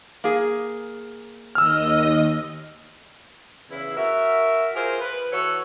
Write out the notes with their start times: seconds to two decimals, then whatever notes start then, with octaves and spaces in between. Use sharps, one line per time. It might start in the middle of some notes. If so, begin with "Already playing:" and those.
0.24 A#3 G#4
1.55 D#2 D#5 E6 F6
3.71 E2 C#3 E4
3.97 F#4 A#4 E5
4.76 F4 G#4 A#4 C5
5.01 B4
5.31 E3 F#4 A4 C#5